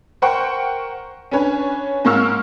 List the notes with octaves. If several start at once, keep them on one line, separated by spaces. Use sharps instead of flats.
A#4 C5 F#5 G5 C#6
C#4 D4 B4 C#5 G#5
G#2 A#3 A#4 C#6 E6 F6